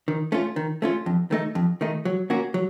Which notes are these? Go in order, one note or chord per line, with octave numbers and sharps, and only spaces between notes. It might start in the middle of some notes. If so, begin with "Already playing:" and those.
D#3
A3 C#4 F4
D#3
A3 C#4 F4
F2
D#3 A3 D#4
F2
D#3 A3 D#4
F#3
A#3 C#4 F#4
F#3